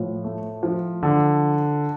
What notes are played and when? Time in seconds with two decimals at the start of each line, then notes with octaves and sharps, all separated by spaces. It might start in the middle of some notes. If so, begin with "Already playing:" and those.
Already playing: A2 F3
0.24 A3
0.63 F3
1.03 D3